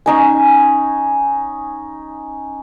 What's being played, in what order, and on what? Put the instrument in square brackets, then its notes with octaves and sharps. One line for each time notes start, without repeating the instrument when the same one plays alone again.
[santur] C#4 D#4 G#5